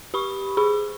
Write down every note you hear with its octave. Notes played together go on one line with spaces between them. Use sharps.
G4 B5 C#6
G#4 B5 C#6